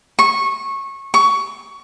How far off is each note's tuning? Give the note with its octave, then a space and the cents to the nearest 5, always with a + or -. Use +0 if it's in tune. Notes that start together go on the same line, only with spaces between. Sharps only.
C#6 -20
C#6 +20